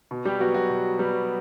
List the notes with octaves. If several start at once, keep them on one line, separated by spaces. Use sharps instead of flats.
B2
G3 G4
F#3 G3 B3 F#4
F#3 F#4
B2
G3 B3